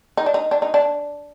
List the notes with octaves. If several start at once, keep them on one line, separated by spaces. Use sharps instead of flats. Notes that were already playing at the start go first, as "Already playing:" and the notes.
D#4
D4
D#4
D4
D#4
D4